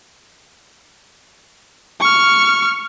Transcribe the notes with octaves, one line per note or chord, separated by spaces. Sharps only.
C#6 F6